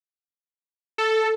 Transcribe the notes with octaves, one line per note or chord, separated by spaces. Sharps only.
A4